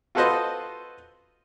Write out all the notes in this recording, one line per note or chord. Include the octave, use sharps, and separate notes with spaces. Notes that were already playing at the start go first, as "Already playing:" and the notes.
F4 F#4 A4 B4 C5 D#5